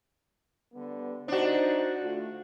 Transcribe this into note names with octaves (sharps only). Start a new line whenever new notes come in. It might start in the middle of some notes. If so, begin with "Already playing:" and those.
D3 G3 B3
D4 D#4 F#4 C5
D3 A3 F4